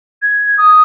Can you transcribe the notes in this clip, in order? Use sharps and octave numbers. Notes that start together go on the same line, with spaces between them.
G#6
D#6